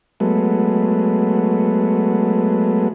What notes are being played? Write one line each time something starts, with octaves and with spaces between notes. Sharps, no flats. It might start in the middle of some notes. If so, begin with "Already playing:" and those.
F#3 G#3 A3 B3